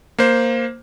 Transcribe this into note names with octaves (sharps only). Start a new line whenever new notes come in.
A#3 C5